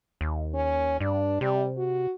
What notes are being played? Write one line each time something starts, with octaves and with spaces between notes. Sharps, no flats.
D#2
C#4
G2 D4
C3 G3
F#4